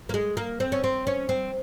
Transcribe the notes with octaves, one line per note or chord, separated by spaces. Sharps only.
A#3
G#3
A#3
C4
C#4
C4
C#4
C4